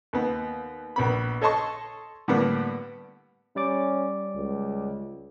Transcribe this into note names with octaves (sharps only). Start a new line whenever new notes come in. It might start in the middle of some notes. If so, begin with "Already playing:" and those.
D#2 B3
A#1 B3 B5
A4 C#5 D#5 A5 C6 C#6
A2 D3 G3 A#3 B3 D4
G3 C#4 D5 D6
C#2